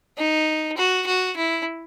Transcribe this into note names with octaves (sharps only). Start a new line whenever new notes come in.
D#4
F#4
F#4
E4